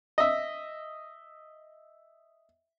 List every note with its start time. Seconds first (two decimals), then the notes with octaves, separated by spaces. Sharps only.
0.18 D#5 E5